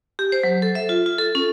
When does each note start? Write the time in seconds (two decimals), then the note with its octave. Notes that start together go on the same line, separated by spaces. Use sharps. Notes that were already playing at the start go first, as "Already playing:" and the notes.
0.19 G4
0.32 C5
0.44 F#3
0.62 A4
0.75 E5
0.89 F4
1.06 F4
1.19 A4
1.35 C#4